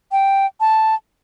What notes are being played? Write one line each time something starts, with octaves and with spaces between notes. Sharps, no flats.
G5
A5